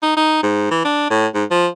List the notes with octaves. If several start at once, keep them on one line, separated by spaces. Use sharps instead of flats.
D#4
D#4
G#2
E3
D4
A2
G#2
F3